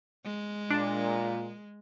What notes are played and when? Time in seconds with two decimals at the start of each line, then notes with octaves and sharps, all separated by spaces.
0.25 G#3
0.70 A#2 D4